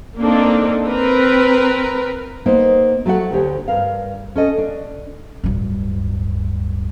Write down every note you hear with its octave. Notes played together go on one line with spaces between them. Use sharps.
A#3 C4 D4 D#4 A4
C4 A#4 B4
A#3 B3 D#4 C5
F#3 A3 F#4 F#5
D2 D3 G4 C#5
G2 A#4 F5
C#4 A4 D#5
D4
D1 G2